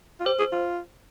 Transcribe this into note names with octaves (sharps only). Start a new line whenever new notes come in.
F4
G4 C5
G#4
F4